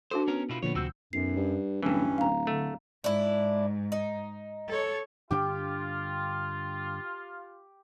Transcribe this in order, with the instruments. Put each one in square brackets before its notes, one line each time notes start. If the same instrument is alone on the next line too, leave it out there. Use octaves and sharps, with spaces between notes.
[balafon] D4 F#4 A4 [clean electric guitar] C5
[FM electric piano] B3 [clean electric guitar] C#4 A#4
[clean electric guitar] B2 E4 F4
[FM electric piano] A#2 D3 F3 [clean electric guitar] B3 C#5
[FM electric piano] D2 E6 G6 [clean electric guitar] C3 C4 F#4
[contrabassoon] B1 [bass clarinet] F#2 [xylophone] C7
[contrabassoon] G2
[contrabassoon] D1 [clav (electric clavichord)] G2 E3 [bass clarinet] C#4
[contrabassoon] D1 [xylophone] F5 A#5
[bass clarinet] D3 [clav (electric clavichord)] A3
[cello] G#2 [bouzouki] D4 E4
[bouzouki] D#4
[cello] A4 C#5
[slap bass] G2 D3 D4 [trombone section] F4 [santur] G4 G5